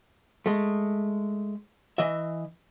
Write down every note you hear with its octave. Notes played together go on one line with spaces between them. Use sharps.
G#3 A3
E3 D#5 E5